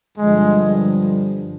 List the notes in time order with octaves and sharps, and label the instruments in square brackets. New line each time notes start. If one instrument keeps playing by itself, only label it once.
[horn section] G2 D3 F3 G#3